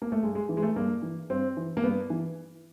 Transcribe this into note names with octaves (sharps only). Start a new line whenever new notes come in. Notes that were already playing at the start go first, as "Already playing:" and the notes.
A#3
A3
G2 G#3
G#3
E3
G#3
A3
G2 A#3
E3
G2 C4
E3
A#3
G2 B3
E3